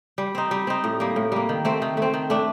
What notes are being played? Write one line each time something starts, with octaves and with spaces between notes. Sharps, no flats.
G3
C4 D#4
G3
C4 D#4
A2
G3 A#3
A2
G3 A#3
D#3
A3 C4
D#3
A3 C4
D#3
A3 D4